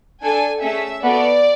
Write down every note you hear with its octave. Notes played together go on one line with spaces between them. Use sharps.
D4 A4 G#5
A3 C#4 G#4 E5
B3 F#4 A4 D5